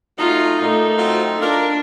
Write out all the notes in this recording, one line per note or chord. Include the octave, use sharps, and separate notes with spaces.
F#3 A3 D#4 F4
A#2 A3 D#4
F#3 C4 F4
D4 F4 A#4